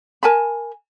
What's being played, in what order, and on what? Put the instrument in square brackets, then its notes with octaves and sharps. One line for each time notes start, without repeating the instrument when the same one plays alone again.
[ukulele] A#4 G#5 A5 B5